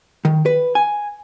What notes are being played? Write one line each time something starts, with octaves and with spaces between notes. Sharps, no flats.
D#3
B4
G#5